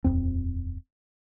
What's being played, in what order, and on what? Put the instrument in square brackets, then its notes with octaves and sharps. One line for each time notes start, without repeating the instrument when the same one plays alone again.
[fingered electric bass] D#1 G#1 F2 C4